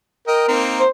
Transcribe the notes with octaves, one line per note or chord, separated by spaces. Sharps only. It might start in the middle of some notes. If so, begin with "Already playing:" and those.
A#4 D#5 G5
A#3 C4 D#4
C5